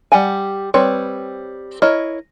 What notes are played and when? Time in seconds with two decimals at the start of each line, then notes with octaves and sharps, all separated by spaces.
0.12 G3 G4 F#5 G#5
0.74 G3 C4 B4 C#5
1.82 E4 A#4 C#5 D#5